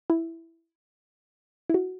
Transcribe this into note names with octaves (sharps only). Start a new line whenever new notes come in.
E4
E4
F#4